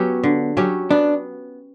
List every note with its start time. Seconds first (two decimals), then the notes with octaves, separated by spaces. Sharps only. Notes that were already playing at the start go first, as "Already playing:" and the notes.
Already playing: F#3 B3 C#4 G4
0.24 D3
0.57 F#3 C#4 G4
0.91 B3 D4